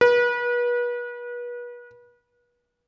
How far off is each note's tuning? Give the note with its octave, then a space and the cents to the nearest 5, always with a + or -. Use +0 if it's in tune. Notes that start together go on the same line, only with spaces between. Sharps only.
B4 -35